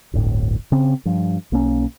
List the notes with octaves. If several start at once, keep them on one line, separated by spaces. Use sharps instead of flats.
D1 G1 A2
C#3 C4
G2 F3
B1 A#3 C#4